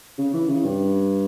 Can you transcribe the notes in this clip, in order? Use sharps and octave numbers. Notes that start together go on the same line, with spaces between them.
C#3
E3
C#3
G2